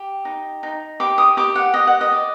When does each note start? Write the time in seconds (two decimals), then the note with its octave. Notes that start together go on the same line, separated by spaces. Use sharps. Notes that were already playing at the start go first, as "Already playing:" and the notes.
Already playing: G4
0.25 D#4
0.63 D#4
1.00 G4 D6
1.18 D#6
1.37 G4 D6
1.55 F#5
1.74 G4 D#5
1.87 F#5
2.01 D#5
2.12 D5